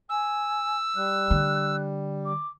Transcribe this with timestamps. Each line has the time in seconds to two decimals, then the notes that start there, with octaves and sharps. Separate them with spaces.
0.09 G#5 E6
0.96 G3 F#6
1.30 D3
2.25 D6